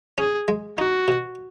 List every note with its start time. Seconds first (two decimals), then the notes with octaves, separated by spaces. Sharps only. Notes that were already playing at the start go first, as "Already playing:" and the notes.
0.18 C#4 G#4
0.48 G#3
0.78 D#4 F#4
1.08 B2